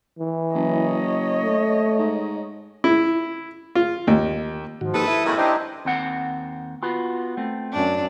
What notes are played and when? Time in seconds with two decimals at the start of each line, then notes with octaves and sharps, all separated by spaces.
0.19 E3
0.54 F#1 C#5 D#5
1.43 A3
1.99 G#2
2.84 E4
3.75 F4
4.07 D#2
4.81 G#2 D#3 F3 F#4
4.94 A#3 D#4 G4 A4 B4 D#6
5.07 E4 E5
5.25 F#2 A2 G#3 A#3 B3
5.37 C3 C4 D4 D#4 G4 D#5 G5 A#5
5.85 D#2 C4 F#5
6.83 B3 F4 F#4
7.37 A3 C4
7.73 F#2 D4